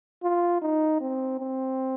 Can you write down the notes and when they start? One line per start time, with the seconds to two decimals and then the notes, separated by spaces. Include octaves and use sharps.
0.23 F4
0.62 D#4
1.01 C4
1.40 C4